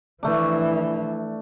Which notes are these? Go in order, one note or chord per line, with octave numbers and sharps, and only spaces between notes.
E3 F3 A3 D4